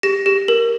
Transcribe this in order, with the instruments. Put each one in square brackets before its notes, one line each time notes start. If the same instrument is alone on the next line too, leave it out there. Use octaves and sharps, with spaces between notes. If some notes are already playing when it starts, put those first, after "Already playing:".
[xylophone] G4 A#6
G4
A#4